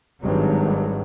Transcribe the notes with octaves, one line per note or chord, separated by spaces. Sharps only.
G#1 G2 F#3